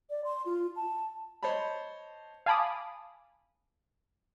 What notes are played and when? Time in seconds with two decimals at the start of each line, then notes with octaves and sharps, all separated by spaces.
0.10 D5
0.25 C6
0.46 F4
0.76 A5
1.43 C5 C#5 D#5 A5 B5
2.46 F5 G#5 A5 B5 D6 D#6